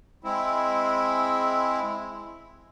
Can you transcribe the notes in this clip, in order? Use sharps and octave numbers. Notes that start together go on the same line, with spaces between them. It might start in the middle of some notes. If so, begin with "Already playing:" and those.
G#3 C4 E4